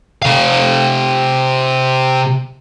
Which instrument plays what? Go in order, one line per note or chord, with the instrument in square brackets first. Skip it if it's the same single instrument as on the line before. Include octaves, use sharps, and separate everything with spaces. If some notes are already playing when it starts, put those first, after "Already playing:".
[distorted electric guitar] C3 F5